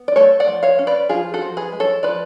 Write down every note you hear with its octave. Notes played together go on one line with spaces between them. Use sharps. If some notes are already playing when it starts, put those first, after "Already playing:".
Already playing: B3
D5
A3 A4 C#5
D5 F#5
F3
C#5 F5
C#4
B4 D5
F3 F4 G#4
F#4 A4
F3
G#4 B4
G#3
A4 C#5
F3 B4 D5